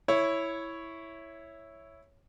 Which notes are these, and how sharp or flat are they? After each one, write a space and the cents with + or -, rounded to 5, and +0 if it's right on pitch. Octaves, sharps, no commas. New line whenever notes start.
E4 +0 C#5 +0